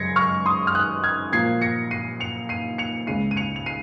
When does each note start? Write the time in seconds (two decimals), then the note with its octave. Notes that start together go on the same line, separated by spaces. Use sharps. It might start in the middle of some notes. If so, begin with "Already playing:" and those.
Already playing: F#2 C#3 G#3 G#6 A#6 C7 C#7
0.16 C#6 F6
0.46 C6 D#6
0.67 F6
0.75 D#6 F#6
1.04 F6 G#6
1.33 A#2 F3 A#3 G#6 C7
1.62 A#6 C#7
1.91 C7 D#7
2.20 C#7 F7
2.49 C7 D#7
2.78 C#7 F7
3.07 C#2 C#3 G#3 C7 D#7
3.31 D#7
3.37 C#7 F7
3.56 F7
3.66 C7 D#7